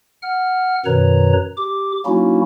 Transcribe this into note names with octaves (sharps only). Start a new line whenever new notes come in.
F#5 F6
F#2 B2 D#3 B4 C#5 A#5
G4 D6
F#3 A#3 C#4 D#4 E4 F#4